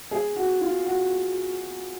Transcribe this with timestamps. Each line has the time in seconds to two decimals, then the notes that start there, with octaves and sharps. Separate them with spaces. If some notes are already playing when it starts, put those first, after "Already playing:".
0.11 G#4
0.36 F#4
0.61 F4
0.86 F#4